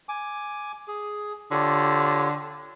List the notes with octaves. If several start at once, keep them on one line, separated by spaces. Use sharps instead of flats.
G#5 D6
G#4
D3 F4 G4 C#5